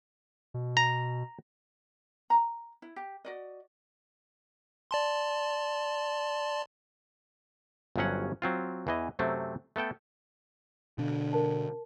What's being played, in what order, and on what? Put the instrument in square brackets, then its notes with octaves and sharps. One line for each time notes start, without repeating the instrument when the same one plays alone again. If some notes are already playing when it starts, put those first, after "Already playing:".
[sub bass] B2
[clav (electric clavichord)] A#5
[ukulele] A#5
E4
G4
F#4 D5 D#5
[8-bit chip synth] D5 A5 C6
[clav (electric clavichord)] G1 G2 F3 F#3 C#4 F#5
F#3 C4 F4
E2 E3 D#5
F#2 C3 F#3 A3 C4
A3 B3 A4 G5
[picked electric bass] B2 D4 [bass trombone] D3
[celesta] A#4 A5